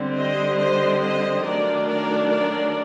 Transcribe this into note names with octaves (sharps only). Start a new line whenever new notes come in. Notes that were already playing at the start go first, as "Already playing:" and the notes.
Already playing: D3 G3 C4
C5 D#5
C5 D#5
C5 D#5
D#3 F#3 A3 D4 A#4 D5
A#4 D5
A#4 D5